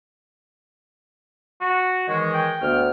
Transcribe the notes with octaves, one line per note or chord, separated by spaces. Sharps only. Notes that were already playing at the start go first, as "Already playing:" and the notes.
F#4
D#3 E3 G#3 C#5
G5
D2 B3 F6